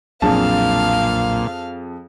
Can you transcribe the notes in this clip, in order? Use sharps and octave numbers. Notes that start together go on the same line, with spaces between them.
B1 F2 A#2 F#3 D4 G#4 F5 A5